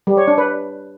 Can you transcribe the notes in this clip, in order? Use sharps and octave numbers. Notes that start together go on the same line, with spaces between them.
G3
C#5
D4
B4